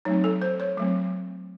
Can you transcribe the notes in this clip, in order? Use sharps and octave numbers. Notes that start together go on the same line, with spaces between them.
F#3 A3 C4 D#4
A4
C5
C#5
F#3 A3 C4